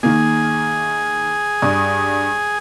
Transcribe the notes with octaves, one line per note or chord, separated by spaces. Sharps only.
D#3 A#3 G#4
G2 D5 D#6